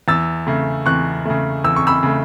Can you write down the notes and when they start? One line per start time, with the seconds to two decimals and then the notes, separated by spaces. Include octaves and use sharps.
0.08 E2 E6 A6
0.47 C#3 A3
0.86 E2 C#6 F#6
1.25 C#3 A3
1.64 E2 E6
1.76 C#6
1.87 B5 E6
2.03 C#3 A3